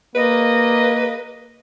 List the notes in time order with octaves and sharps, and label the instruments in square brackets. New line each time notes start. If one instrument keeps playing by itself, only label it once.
[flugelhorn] A#3 [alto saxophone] B4 [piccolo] D#5